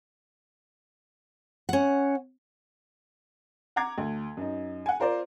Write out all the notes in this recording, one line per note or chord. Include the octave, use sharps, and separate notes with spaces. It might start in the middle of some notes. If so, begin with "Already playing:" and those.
C#4 F#5
F#5 A#5 D6 G#6
D2
F#2 D#4
F#5 G#5
F4 A#4 C5 D5